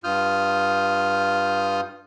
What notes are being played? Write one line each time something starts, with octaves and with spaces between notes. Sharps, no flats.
G2 F4 D#6 F6 G6